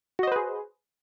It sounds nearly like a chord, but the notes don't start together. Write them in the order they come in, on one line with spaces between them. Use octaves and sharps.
F#4 D#5 C5 B4 G#4